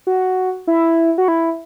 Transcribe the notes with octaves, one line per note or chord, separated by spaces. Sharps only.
F#4
E4
F#4
E4